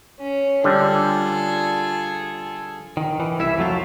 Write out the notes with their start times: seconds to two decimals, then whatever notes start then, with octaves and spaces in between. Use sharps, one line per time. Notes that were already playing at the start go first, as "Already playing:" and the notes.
0.18 C#4
0.64 D3 G3 D4 F4 G#4 A4
2.97 D#3
3.20 E3
3.39 C2 E4 E5
3.58 F2 F#3 A3 F4